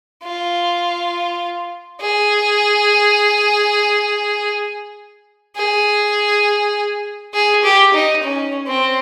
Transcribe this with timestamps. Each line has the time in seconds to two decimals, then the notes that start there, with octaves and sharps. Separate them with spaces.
0.23 F4
2.01 G#4
5.56 G#4
7.34 G#4
7.64 G4
7.94 D#4
8.23 C#4
8.67 C4